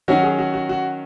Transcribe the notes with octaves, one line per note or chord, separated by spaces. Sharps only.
D#3 F#3 C#4 F#4
G#4
F#4
F#4
F#4